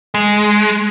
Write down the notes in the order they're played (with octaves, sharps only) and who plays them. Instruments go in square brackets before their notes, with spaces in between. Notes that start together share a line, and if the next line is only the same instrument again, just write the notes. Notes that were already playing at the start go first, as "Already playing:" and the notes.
[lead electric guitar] G#3